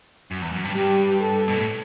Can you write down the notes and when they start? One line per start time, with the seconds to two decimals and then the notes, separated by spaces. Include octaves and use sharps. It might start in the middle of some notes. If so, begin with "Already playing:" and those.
0.31 F#2
0.42 E2
0.53 F#2
0.64 G2
0.75 G2 G4
1.21 A4
1.48 B2
1.56 A2